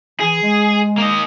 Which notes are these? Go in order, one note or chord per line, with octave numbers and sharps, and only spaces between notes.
E3 G#4
G#3
A#3 D#5